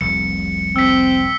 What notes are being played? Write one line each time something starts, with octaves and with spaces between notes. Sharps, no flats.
F1 C2 C#7
C4 E6 B6